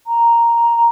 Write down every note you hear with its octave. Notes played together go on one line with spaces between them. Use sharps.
A#5